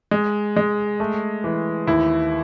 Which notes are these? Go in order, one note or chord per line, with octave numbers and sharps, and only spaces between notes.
G#3
G#3
A3
E3
D#2 E4